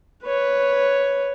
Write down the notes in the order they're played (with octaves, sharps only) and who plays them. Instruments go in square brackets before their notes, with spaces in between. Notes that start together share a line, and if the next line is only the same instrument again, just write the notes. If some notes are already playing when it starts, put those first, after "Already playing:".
[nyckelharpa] B4 C#5